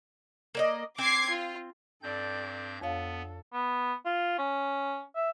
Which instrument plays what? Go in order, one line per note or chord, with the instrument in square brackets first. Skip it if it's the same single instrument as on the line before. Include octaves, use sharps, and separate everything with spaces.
[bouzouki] A#3 D5 D#5
[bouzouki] C4 [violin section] D6 G#6 C7
[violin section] F4
[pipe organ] G2 C4 G6 [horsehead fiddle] A4 D5
[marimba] F2 C#5 F5 [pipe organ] B3 [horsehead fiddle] D4 A4
[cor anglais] B3
F4
C#4
E5